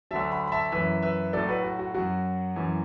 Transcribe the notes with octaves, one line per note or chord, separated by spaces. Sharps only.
D2 D3 F#3 E5 A5
F#5 B5
B5
E5 A5
F#2 E3 B4 E5
B4 E5
A2 F#3 A4 D5
F#4 B4
F#4
F#4
F#2 F#3 F#4
F#2 E3